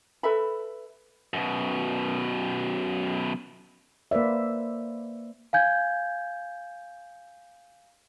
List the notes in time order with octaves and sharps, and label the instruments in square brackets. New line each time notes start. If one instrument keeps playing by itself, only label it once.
[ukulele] A4 B4 E5 B5
[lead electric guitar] F#2 B2
[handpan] A#3 B4 C5 D5 E5
[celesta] F5 G#5 G6 G#6